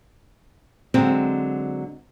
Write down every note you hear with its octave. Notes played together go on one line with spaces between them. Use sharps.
D3 F#3 G#3 C4